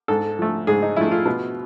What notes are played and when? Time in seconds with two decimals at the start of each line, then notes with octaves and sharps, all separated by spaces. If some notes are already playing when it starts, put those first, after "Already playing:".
0.08 G#2 A4
0.39 F3 A3
0.67 G#2 G#4
0.82 D#4
0.96 F3 A3 E4
1.11 F4
1.26 B2